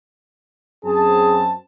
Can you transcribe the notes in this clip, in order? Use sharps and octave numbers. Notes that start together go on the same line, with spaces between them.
F#2 C4 G#4 A5